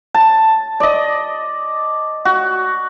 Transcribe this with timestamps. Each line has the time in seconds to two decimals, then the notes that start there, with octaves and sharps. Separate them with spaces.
0.15 A5
0.80 D5 D#5
2.25 F#4